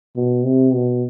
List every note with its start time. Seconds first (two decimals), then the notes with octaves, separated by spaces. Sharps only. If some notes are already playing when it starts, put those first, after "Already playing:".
0.16 B2
0.44 C3
0.73 B2